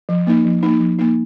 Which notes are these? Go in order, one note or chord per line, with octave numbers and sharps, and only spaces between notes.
F3
A#3 D#4
F3
A#3 D#4
F3
A#3 D#4